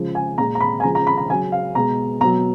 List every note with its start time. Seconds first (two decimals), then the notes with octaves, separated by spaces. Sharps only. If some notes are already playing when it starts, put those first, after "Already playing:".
Already playing: C#3 F3 G#3
0.15 G#5
0.38 A#2 G#3 A#5
0.55 A#5
0.60 B5
0.80 G#5
0.83 C#3 F3 G#3 A#5
0.95 A#5
1.07 B5
1.18 A#5
1.29 C#3 F#3 G#5
1.52 F5
1.75 B2 G#3 A#5
2.20 B2 A#5
2.24 F#3